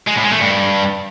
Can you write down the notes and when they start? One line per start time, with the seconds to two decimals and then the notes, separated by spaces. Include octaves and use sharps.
0.08 G#3
0.16 A2
0.25 G#3
0.33 A3
0.41 G2